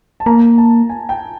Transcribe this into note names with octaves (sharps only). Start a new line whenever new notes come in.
A5
A#3 A#5
A5
G#5
G5